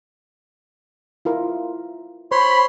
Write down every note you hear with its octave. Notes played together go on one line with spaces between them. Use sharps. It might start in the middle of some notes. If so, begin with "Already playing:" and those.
E4 F4 A#4
C5 C#5 B5 C6